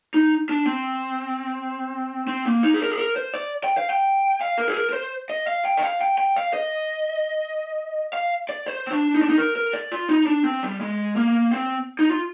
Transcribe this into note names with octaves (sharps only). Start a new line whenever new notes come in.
D#4
D4
C4
C4
A#3
D#4
G#4
A#4
G#4
A#4
C5
D5
G5
F5
G5
F5
A#4
G#4
A#4
A#4
C5
D#5
F5
G5
D#5
F5
G5
G5
F5
D#5
F5
D5
C5
C4
D4
D#4
D4
D#4
A#4
A#4
D5
F4
D#4
D4
C4
G3
G#3
A#3
C4
D#4
F4